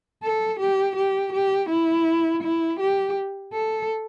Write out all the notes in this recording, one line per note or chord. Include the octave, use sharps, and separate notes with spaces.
A4
G4
G4
G4
E4
E4
G4
A4